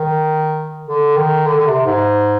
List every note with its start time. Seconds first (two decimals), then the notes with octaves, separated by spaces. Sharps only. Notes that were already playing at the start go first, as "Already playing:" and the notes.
Already playing: D#3
0.86 D3
1.16 D#3
1.47 D3
1.57 D3
1.67 C3
1.86 G#2